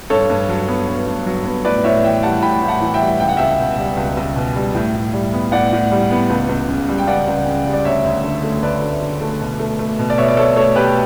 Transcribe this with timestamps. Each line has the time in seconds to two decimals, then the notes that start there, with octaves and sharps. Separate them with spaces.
0.10 G2 A4 C#5
0.30 G2
0.49 F#3
0.68 B3
0.88 G2
1.07 G2
1.26 F#3
1.46 B3
1.64 A2 B4 D5
1.84 A2 C#5 E5
2.04 E3 E5 G5
2.23 G3 F#5 A5
2.42 A2 G5 B5
2.62 A2
2.68 F#5 A5
2.81 E3
2.94 E5 G5
3.00 G3
3.20 C#2 G5
3.29 F#5
3.37 C#2 E5 G5
3.59 B2
3.78 G3
3.97 C#2
4.17 C#2
4.36 B2
4.56 G3
4.75 A2
4.95 A2
5.13 G3
5.34 B3
5.52 A2 D5 F#5
5.72 A2
5.92 G3
6.11 B3
6.30 C#2
6.49 C#2
6.68 C#3
6.89 G3
6.98 G5
7.07 C#2 D5 F#5
7.27 C#2
7.46 C#3
7.66 G3
7.73 D5
7.85 D2 C#5 E5
8.04 D2
8.24 D3
8.43 A3
8.62 D2 B4 D5
8.81 D2
9.01 D3
9.21 A3
9.40 B2
9.59 A3
9.79 A3
9.99 B2
10.10 D5
10.18 B2 C#5 E5
10.28 D5
10.37 A3 A4 C#5
10.56 A3 A4 C#5
10.76 B2 G4 B4